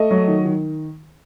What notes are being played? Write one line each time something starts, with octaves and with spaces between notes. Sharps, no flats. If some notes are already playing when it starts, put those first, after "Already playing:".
Already playing: A3 D#5
F#3
D#3
D#3